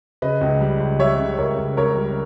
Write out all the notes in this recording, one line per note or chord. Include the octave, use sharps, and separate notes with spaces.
C#3 B4 D#5
C#2
G3
C#2
G3 C#5 E5
C#3
C#2 A#4 C#5
C#2
C#2 A#4 C#5
G3